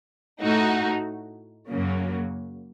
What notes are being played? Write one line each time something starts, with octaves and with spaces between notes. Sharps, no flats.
A2 A3 D#4 F#4
F#2 C#3 F#3 A#3